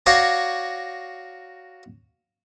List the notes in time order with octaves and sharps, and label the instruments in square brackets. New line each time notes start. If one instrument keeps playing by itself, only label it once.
[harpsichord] F#4 C#5 D5 F5 A#5